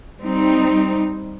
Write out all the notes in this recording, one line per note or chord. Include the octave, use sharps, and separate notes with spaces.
G3 C4 D#4